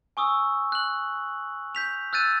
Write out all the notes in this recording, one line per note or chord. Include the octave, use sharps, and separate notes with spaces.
G#5 C#6 D#6 E6
F#6 F#7
G6 B6 F7
E6 F#6 G6 A6 D#7